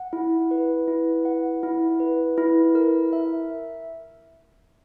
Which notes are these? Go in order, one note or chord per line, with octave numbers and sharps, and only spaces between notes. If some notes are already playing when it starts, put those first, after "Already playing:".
Already playing: F#5
E4
B4
E4
F#5
E4
B4
E4
A#4
E5